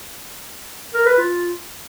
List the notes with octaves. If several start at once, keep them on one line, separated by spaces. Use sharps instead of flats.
A#4
B4
F4